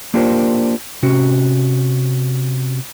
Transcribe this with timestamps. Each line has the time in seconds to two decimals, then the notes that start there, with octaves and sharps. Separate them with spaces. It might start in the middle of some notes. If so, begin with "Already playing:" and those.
0.14 A#3 D4 F4 G4 A#4 C5
1.03 C3 C#4 F#4